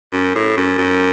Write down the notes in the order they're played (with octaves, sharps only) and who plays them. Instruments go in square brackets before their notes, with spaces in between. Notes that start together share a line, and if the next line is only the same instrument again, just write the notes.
[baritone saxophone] F#2
A2
F#2
F#2